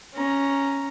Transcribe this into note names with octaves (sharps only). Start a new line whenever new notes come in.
C#4 A#5